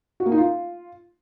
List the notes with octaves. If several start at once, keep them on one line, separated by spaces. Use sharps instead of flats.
F#4
A#3
D#4
F4